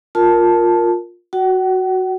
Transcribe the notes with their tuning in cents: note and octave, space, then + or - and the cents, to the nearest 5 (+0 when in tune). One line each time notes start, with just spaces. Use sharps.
F4 +10 A#4 +0 A5 +0
F#4 +0 F#5 +40